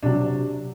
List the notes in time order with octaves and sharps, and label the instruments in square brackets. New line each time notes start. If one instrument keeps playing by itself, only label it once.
[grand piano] C3 F#3 D4